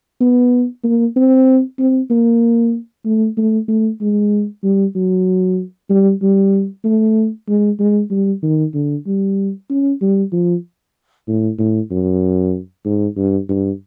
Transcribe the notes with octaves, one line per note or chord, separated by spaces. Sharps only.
B3
A#3
C4
C4
A#3
A3
A3
A3
G#3
G3
F#3
G3
G3
A3
G#3
G#3
G3
D#3
D3
G3
C#4
G3
F3
A2
A2
F#2
G#2
G2
G2